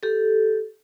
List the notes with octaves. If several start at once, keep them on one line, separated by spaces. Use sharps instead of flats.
G4 A4